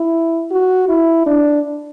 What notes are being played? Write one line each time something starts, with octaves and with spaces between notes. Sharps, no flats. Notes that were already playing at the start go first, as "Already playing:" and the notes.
Already playing: E4
F#4
E4
D4